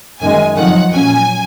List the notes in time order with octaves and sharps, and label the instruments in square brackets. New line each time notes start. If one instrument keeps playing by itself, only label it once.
[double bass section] F#2 D#3 G#3 [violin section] G#5
[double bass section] F2 D#3 F#3 [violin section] F#5
[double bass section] A#2 F#3 C#4 [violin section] G#5